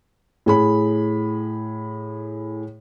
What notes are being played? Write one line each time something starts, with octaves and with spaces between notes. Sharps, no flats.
A2 G#4 B5